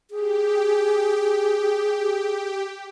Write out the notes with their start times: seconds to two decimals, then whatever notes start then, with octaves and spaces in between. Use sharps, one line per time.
0.11 G4 G#4